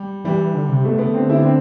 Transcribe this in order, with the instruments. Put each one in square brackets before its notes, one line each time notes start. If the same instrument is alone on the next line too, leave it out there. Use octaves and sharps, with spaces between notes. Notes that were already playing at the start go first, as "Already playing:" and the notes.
Already playing: [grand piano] G3
[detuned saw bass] E3 [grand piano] G3
[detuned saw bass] E3
D3
C3
[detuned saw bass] B2 [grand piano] A3
[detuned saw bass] C3 [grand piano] B3
[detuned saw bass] D3
[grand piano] C4
E4
D4
C4